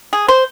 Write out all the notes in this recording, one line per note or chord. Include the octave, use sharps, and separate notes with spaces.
G#4
C5